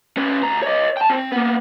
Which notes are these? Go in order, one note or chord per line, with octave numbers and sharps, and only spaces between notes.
C#4 B4
D2 A#5
C#5 D#5
G5 A5
C4
A#3 B3